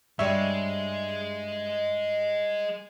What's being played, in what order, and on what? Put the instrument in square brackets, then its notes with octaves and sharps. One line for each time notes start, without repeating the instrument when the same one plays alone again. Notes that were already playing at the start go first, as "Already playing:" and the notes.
[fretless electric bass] G2 [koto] G3 C#5 [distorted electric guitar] G#3 [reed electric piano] E5